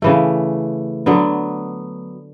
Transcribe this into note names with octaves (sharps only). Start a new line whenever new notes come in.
C#3 E3 A3
D3 F#3 B3